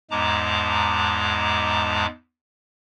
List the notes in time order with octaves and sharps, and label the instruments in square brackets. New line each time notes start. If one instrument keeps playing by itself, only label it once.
[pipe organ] E2 G#2 G#3 A5 A#5 D6